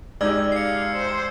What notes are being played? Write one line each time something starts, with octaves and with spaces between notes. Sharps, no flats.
G#3 D#4 G4 D5 E6 F6 G#6
F5 C7 C#7
C5